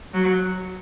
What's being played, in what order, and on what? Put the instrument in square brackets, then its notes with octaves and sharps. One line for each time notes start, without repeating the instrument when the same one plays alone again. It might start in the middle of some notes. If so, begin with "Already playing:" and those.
[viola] F#3